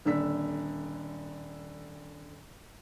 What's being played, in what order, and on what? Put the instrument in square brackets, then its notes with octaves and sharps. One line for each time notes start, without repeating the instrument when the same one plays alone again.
[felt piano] D#1 D3 E6 B6